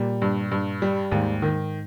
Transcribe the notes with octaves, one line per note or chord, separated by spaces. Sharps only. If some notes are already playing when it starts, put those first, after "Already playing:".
Already playing: A#2 G3
G2
G2
G3
D#2 G#2
D#3